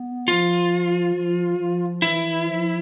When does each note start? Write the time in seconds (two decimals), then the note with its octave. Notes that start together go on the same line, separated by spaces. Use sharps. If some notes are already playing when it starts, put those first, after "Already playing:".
Already playing: B3
0.28 F3 F4
1.16 F3
1.58 F3
2.02 E3 E4
2.46 F3